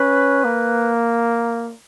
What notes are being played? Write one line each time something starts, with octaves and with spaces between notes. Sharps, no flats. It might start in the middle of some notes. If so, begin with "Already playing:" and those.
Already playing: C#4 B4
A#3